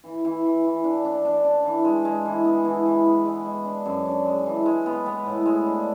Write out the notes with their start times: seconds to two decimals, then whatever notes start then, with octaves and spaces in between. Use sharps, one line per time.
0.04 E3
0.25 E3
0.44 E3
0.64 E3
0.84 D4
1.05 D4
1.25 D4
1.45 D4
1.65 E3
1.85 G#3
2.05 G#3
2.25 E3
2.45 B3
2.65 E3
2.86 E3
3.06 B3
3.25 G#3
3.45 G#3
3.65 D4
3.85 F#2
4.06 D4
4.26 G#3
4.46 E3
4.66 G#3
4.86 B3
5.06 B3
5.26 A2
5.46 G#3
5.66 D4